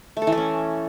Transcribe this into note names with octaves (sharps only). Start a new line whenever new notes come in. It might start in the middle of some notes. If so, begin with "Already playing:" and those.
A3
A4
E3
A3
C#4